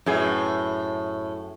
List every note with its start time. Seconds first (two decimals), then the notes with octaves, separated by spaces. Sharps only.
0.06 F#2 A2 G#4 B4